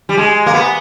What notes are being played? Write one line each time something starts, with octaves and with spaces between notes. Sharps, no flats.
G3
G#3
A#3
B3